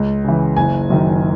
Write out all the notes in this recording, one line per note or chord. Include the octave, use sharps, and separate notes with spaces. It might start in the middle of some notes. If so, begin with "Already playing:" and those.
Already playing: C#2
C#3 E3
F#1 G#5
F#2 D#3